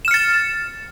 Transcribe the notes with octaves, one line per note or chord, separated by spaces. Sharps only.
F6 A6 C#7 E7